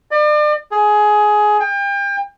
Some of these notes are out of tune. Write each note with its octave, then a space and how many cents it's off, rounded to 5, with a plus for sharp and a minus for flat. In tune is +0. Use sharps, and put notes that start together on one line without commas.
D5 +40
G#4 +15
G5 +35